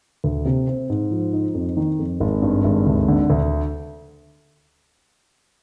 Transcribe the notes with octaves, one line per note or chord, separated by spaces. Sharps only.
D2
C3
C4
G#2
F3
D#4
F2
D#3
F2
G#1
G2
G#1
D2
D3
D2